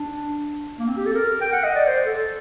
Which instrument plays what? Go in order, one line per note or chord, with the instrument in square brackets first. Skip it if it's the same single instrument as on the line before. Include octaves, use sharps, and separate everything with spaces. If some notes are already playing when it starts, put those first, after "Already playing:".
Already playing: [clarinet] D4
A#3
C4
G4
A4
A#4
G5
F#5
D#5
D5
C5
A4